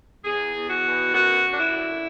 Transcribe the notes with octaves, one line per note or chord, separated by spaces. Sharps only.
E2 G#4
E2
F#4
B2
F#2 F#4
F#2
D4
E4
D3